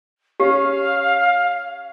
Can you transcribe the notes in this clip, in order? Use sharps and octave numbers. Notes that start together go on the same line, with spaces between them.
C#4 G4 F5